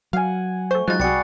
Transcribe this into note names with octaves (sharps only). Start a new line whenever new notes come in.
F#3 F5 F#5 G#5
A3 C5 C#6
F3 F#3 G#3 D#4 F#6 A6
C2 G3 F#4 G#4 A6 C#7